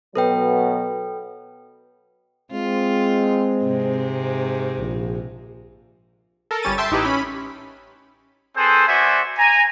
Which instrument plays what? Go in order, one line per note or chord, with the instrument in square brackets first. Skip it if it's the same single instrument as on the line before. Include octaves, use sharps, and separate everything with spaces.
[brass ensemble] B2 F#3 [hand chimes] A4 B4 G5
[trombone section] G#3 C4 [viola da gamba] F4
[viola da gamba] G#2 C3
[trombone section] A#1
[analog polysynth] A4 A#4
G1 G3 C#4 A6 D#7
E5 G5 A5 C6
A1 D#4 E4 G4 B4
C#4 B5
[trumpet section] C4 G#4 A4 B4 C5
B3 F#4 C5 D5 E5 G#5
G#5 A#5